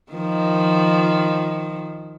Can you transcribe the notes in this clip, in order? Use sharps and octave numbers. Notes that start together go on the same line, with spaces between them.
D#3 F3